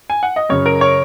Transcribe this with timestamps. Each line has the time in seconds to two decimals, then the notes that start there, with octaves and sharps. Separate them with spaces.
0.10 G#5
0.23 F#5
0.36 D#5
0.49 F#2 C#3 C#5
0.66 A#4
0.81 C#5